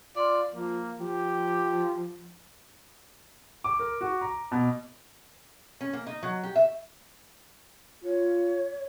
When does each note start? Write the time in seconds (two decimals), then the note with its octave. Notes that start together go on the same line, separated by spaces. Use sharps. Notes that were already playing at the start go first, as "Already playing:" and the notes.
0.16 F4 D5
0.54 F3 A#3
0.99 F3 G4
3.64 D6
3.79 A#4
4.01 F#4
4.21 A#5
4.52 B2
5.81 C#4
5.93 A#3
6.06 D#4
6.23 F#3
6.43 G4
6.56 E5
8.04 F4 C#5